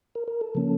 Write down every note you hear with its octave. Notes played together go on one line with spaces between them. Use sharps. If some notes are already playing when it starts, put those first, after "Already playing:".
A#4
A#4
A4
C#3 F3 A#3 C#4